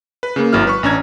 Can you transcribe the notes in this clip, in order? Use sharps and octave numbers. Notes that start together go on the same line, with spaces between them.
B4
C#3 A#3
G#1 F#3 E4 F6
B4 C#6
A1 C#4 D4 A#5 G#6